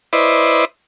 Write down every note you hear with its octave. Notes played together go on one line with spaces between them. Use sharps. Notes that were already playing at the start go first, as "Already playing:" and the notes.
E4 B4 C5 D5 D#5